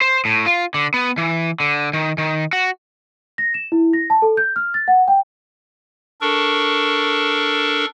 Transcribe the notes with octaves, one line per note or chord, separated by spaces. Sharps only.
C5
A2
F4
D3
B3
E3
D3
D#3
D#3
F#4
A#6
E7
E4
A#6
A5
A4
G6
F6
A6
F#5
G5
D4 A4 A#4 C#6